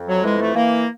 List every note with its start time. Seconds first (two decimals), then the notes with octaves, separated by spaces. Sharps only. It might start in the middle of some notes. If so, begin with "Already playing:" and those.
Already playing: F2
0.08 F#3
0.23 E3 G#3
0.39 A3
0.54 E3 A#3